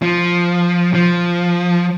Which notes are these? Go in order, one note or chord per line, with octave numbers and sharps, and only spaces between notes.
F3
F3